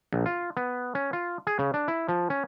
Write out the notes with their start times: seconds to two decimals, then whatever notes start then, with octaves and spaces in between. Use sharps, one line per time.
0.13 A#1
0.26 F4
0.57 B3
0.95 C#4
1.13 F4
1.47 G#4
1.59 C#3
1.74 D4
1.88 E4
2.09 F3
2.30 C#4